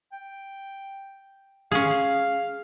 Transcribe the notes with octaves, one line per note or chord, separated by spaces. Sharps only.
G5
C#4 G#4 F5